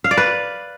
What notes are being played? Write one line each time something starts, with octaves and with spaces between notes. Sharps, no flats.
F5
D5
B4